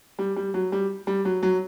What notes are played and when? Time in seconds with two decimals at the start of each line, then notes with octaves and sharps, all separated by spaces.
0.19 G3
0.36 G3
0.54 F#3
0.72 G3
1.07 G3
1.25 F#3
1.43 F#3